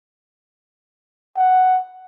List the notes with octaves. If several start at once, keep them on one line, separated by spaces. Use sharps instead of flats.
F#5